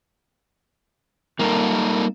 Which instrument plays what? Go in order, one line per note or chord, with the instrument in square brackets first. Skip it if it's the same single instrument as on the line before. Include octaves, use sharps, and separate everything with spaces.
[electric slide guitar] G3 D#4 A#4 [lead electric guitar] A#3 A4